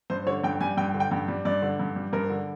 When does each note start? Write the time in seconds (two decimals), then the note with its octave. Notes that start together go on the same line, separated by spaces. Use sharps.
0.10 G2 C5
0.26 D3 C#5
0.43 G2 G5
0.61 G3 G#5
0.77 G2 G5
0.94 D3
1.00 G5
1.11 G2
1.28 G3
1.45 G2 D5
1.62 D3
1.79 G2
1.96 G3
2.13 G2 A#4
2.30 D3